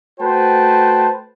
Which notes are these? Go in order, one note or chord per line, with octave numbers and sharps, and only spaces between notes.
A3 F#4 B4 C5 G5 A5